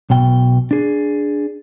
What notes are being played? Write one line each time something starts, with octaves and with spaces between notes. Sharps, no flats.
B1 B2 G5
D4 G#4